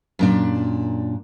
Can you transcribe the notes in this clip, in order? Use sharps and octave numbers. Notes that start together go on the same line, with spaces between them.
F#2 A#2 D4